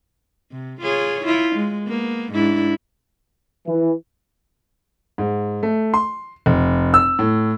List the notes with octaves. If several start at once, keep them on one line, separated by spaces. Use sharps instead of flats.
C3
F4 G#4 C#5
E4 F4
G#3
A#3 B3
G#2 D4 E4
E3
G#2
A3
C6
F1
E6
A2